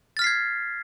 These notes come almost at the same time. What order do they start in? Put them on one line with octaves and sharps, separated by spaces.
A6 F6 B6 C7 G#6